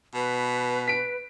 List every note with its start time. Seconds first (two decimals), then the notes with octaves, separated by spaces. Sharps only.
0.14 B2 B4
0.87 B6 D7